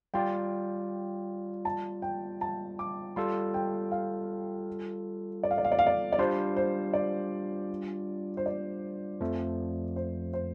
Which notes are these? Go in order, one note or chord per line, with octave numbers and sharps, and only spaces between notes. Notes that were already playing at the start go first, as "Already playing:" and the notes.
G3 F4 D5 G5
A5
G5
A5
D6
G3 F4 A4 C6
G5
F5
D5
F5
D5
F5
D5
F5
D5
D5
G3 D4 F4 C5
C5
D5
C5
D5
F2 F3 A3
C5
C5